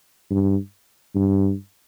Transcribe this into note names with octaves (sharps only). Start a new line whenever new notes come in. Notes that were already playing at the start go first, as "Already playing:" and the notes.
G2
G2